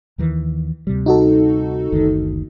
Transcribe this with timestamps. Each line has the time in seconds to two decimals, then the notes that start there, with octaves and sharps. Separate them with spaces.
0.18 D#2 D#3 E3
0.87 D2 C3 G3
1.06 D#4 F#4 A4
1.92 F#1 D2 D#3